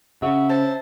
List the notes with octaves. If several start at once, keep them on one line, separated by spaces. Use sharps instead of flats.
C#3 F#4 E5
C5 A5